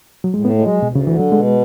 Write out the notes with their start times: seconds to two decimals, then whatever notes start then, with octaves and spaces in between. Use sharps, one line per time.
0.24 F#3
0.34 A2 G#3
0.45 B3
0.50 A3
0.58 G#3
0.67 F#3
0.83 D2 B2
0.95 C#3
1.07 D3 E3
1.19 F#3
1.32 B2 G#3